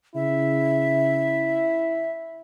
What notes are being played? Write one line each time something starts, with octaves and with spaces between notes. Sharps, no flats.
C#3 E4 E5